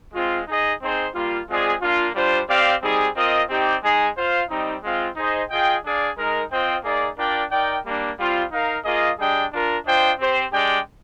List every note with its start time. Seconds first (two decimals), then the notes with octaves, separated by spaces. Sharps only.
0.14 G#3 C4 F4
0.47 D#4 G#4 D#5
0.81 C4 D#4 G#4 C5
1.14 G3 A#3 F4
1.48 G#3 C4 F4 G#4 D5
1.81 A#3 D4 F4
2.15 G3 D4 F4 C5
2.48 C4 G4 D5 F5
2.82 G3 C4 D#4 G#4
3.15 C4 F4 A#4 D#5
3.48 C4 D#4 G4 D5 G5
3.82 G#3 D#4 G#4
4.15 F4 C5 F5
4.49 G3 C4 D#4
4.82 G#3 C4 F4
5.16 D#4 G#4 C5 D#5
5.50 F4 G#4 D#5 G5
5.83 D4 G#4 D5 F5
6.16 G#3 D#4 A#4
6.50 C4 F4 C5 D#5 G5
6.84 A#3 D#4 G#4 D5
7.17 D4 F4 A#4 D5 G5
7.51 D#4 A#4 D5 G5
7.84 G3 A#3 D4
8.17 G3 C4 F4
8.51 D#4 A#4 F5
8.84 A#3 F4 G#4 D#5
9.18 G3 D4 G#4 D#5 G5
9.52 D4 F4 A#4
9.85 D4 F4 C5 D#5 G5
10.19 C4 G4 C5
10.52 G#3 D4 G4 D5 G5